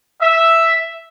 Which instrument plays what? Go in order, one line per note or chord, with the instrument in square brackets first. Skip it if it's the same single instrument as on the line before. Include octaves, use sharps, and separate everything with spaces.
[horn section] E5